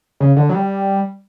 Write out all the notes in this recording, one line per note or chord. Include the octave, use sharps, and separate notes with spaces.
C#3
D3
F#3
G3